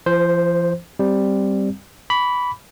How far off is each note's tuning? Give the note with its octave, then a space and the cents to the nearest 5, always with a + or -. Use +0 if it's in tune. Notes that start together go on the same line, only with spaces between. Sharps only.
F3 -40 C5 +0
G3 +0 C4 +0
B5 +0 D6 -40